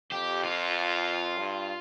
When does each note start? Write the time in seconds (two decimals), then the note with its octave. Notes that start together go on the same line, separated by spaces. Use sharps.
0.12 F2 G4
0.44 F4
1.39 G2